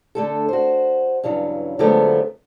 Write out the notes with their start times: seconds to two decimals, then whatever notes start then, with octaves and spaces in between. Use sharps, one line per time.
0.15 D3 A3 A4
0.49 F#4 C5
1.24 G2 C#3 E3 F#3
1.79 D3 F3 F#3 G#3 A3 B3